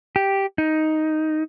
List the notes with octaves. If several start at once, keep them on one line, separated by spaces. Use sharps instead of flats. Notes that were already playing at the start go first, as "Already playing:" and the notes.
G4
D#4